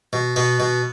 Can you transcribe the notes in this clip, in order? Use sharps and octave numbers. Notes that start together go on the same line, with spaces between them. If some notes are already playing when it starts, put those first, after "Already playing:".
B2
B2 B3
B2